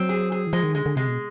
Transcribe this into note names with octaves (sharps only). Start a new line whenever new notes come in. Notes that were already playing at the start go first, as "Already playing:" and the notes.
Already playing: F#3 C4
G#4
G#4
E3
F3 G#3
D#3
D3 G#3
D3
C3 G#3
B2